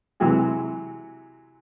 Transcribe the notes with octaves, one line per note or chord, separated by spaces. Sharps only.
C3 E3 F#3 G#3 F#4 G#4